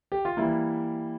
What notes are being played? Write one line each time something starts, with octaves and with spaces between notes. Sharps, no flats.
G4
F4
E3 G3 A#3 E4